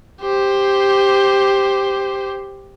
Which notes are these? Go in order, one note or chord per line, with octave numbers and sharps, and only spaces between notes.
G4 C5